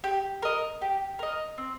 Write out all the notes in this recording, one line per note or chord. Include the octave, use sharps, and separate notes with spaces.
G4
A#4 D#5
G4
A#4 D#5
C4